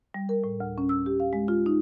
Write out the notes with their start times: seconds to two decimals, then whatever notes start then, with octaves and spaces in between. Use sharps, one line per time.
0.14 G3
0.29 A#4
0.44 A2
0.60 D2
0.78 C#4
0.89 E6
1.06 G4
1.20 F5
1.33 G#3
1.48 F4
1.66 D#4